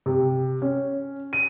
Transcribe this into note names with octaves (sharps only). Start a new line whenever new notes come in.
C3
C#4
D#7